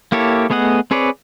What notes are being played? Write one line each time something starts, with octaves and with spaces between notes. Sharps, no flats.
A#3 E4 G4 A4 C#5
A3 B3 G#4 D#5 F#5
C4 G#4 B4 C#5 D5